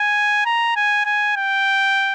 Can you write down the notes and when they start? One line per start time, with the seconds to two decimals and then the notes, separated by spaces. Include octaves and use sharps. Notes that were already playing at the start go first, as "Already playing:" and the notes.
Already playing: G#5
0.45 A#5
0.76 G#5
1.05 G#5
1.36 G5